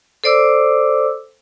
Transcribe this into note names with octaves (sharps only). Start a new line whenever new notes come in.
A4 C5 D5 D6 E6